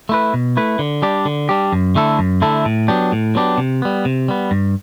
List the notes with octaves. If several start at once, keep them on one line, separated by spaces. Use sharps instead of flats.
A3 E4 B4
B2
A3 E4 B4
D3
G3 D4 G4
D3
G3 D4 G4
F#2
D3 A3 E4 A4
F#2
D3 A3 E4 A4
A2
F#3 B3 D4 G4
A2
F#3 B3 D4 G4
C3
G3 B3
C3
G3 B3
G2